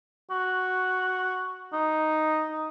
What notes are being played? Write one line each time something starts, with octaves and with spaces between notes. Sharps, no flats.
F#4
D#4
D#4